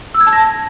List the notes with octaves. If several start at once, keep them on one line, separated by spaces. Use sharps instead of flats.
E6
G#6
A5
A#6